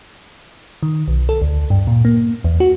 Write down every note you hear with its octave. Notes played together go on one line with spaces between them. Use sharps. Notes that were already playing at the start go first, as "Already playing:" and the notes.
D#3
B1
A4
D2
G2
A#2
A#3
E2
F#4